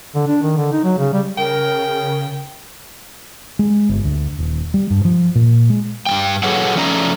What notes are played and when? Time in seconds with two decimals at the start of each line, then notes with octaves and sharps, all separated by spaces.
0.15 D3
0.27 D4
0.42 D#3
0.57 D3
0.73 D#4
0.84 F#3
0.98 C#3
1.13 G3
1.38 C#3 A#4 G5
3.59 G#3
3.89 G1
4.04 D2
4.38 D#1
4.74 G3
4.91 G2
5.05 F3
5.35 A#2
5.70 G#3
6.07 G2 F3 G5
6.43 F#3 G#4 A4 B4 C#5 F#5
6.76 F3 A3 C#4 D5 F#5 A#5